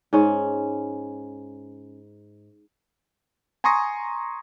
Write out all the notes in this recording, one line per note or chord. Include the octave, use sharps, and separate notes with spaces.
G#2 C#4
G#5 A#5 C6 C#6 D#6 A#6